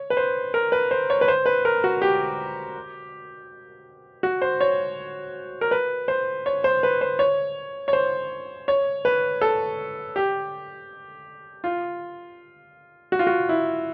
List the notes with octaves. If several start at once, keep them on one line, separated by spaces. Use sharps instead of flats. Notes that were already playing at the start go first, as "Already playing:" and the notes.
Already playing: C#5
B4
C5
A#4
B4
C5
C#5
B4
C5
B4
A#4
F#4
G4
F#4
C5
C#5
A#4
B4
C5
C#5
C5
B4
C5
C#5
C#5
C5
C#5
B4
A4
G4
F4
F#4
F4
F#4
E4